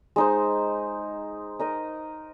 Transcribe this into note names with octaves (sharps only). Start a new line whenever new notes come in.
G#3 D#4 C5
D#4 A#4 D#5